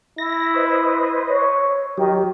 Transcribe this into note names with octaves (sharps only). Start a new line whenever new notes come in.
E4 A#6
B4 C5 D#5
C#5
D#3 F#3 G4